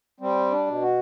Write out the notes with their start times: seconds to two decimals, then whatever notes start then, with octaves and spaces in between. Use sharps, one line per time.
0.20 G3 C4
0.51 D4
0.67 B2
0.82 F#4